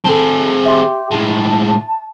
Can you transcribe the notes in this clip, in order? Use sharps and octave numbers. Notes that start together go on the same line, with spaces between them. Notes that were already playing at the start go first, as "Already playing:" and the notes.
C4 G#4 A4 A5
G4 E5 C6
A2 G#3 A5